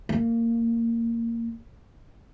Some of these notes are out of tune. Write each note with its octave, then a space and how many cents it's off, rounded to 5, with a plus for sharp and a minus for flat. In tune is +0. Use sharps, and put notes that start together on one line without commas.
A#3 -15